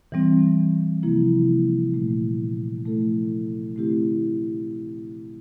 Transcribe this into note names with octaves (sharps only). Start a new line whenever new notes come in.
E3 G3 C4
C3 F3 A#3 E4
A#2 A3 E4
F3 A3 E4 A4
D3 A3 C4 E4 G4